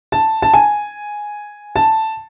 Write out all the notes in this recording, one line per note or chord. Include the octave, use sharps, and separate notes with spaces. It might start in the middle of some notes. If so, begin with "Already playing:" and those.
A5
A5
G#5
A5